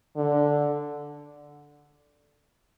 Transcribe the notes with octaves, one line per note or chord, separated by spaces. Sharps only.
D3